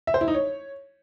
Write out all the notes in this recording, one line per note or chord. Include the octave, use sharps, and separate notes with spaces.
E5
C5
E4
D#4
C#5